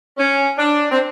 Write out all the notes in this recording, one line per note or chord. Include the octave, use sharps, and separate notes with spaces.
C#4
D4
C4